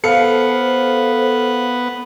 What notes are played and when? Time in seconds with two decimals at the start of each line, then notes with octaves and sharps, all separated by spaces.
0.04 B3 A4 C5 F5 C#7